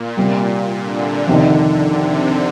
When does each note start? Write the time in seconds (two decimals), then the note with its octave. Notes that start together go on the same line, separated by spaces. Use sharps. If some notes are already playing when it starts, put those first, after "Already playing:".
Already playing: A#2
0.17 C3 G3 A#3
0.72 D3
1.27 F2 C3 D#3
1.83 C3